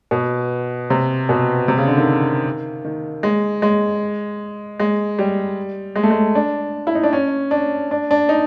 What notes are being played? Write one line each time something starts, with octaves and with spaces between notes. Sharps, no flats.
B2
C3
B2
C3
C#3
D3
D#3
D#3
G#3
G#3
G#3
G3
G#3
A3
G#3
D4
E4
D#4
D4
C#4
D4
D4
D4
D#4